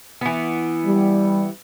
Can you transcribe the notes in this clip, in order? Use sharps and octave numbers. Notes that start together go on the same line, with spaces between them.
E3 B3
G3